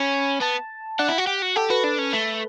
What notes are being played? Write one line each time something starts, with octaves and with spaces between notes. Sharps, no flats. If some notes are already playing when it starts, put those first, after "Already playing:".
Already playing: C#4 B5
B3 A5
D4 F#5
E4
F#4
G4
F#4
G4 A4
F#4 B4
D4
C#4
A3